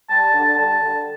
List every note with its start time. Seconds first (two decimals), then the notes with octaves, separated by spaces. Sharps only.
0.10 G3 A5
0.34 D3
0.57 G3 A5
0.81 D3